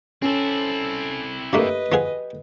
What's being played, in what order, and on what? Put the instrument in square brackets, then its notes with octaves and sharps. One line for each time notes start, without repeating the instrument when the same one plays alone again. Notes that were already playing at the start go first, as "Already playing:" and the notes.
[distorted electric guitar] C4 E4 [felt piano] C#4 [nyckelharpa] A4
[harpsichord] G2 A3 A#3 [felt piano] G4 [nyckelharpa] B4 D#5
[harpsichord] F3 B3 G#4